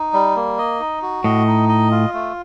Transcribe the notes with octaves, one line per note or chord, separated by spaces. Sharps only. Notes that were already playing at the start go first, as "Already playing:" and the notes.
Already playing: D#4
G3
A#3
D#5
D#4
F#4
A2 D#5
D#4
D#5
F4
A3